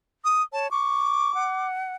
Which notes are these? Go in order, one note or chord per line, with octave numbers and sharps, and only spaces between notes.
D#6
C#5 A5
C#6 D6
F#5